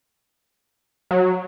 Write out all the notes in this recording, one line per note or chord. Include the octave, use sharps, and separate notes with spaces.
F#3